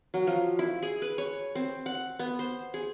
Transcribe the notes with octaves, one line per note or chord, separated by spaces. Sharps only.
F#3
F3
E4
G#4
B4
C#5
C4
F#5
B3
C5
G#4